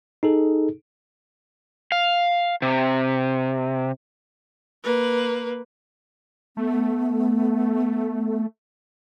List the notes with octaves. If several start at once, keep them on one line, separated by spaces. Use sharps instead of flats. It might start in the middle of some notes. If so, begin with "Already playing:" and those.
D#4 G#4 A4
F5
C3
A#3 B4
A3 B3